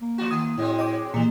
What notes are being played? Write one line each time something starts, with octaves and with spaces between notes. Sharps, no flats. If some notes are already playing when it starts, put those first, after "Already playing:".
A#3
F3 F4 F#4
D#3 D#6
A2 F#3 G#3 C4
D#5 G5 D6
A#2 E3 G3 A#3